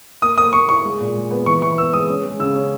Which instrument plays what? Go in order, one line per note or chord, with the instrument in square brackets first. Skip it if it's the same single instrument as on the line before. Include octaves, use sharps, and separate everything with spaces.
[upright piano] A#3 [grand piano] D#6
[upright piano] A#3 [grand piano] D#6
[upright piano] A#3 [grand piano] C#6
[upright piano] E4 [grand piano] C#6
[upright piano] G#3
A#2
G#3
B3
[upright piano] E3 [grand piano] C#6
[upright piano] E3 [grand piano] C#6
[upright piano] B3 [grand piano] E6
[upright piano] G#3 [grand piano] D#6
[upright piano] C#4
G#3
[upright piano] C#3 [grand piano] E6
[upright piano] C#4